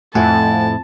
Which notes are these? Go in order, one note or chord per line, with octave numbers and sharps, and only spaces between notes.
F2 A2 A3 E4 F#5 G#5 A5